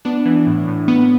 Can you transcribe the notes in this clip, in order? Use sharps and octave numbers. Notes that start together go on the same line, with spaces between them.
B3 D4
E3
A2
A2
B3